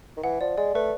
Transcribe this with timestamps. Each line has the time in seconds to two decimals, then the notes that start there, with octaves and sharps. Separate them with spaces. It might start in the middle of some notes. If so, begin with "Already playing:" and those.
0.17 D#3
0.23 E3 F#5
0.41 F3 D5
0.58 G#3 D5
0.74 A3 B4